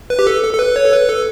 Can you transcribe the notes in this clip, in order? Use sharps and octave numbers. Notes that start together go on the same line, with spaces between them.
B4
G4
A4
A4
A4
B4
C#5
A4
B4
A4